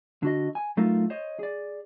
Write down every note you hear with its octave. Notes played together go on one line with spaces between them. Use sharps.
D3 F#4 D#5
G#5
F#3 A3 D#4 F4 A4 A#4
C5 C#5 D#5
G#4 D5